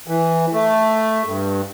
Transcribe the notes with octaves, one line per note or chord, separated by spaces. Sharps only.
E3
A3
G2